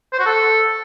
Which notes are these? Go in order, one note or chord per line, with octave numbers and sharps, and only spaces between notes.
C5
F#4
A4